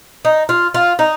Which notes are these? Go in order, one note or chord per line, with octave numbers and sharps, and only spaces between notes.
D#4
F4
F4
D#4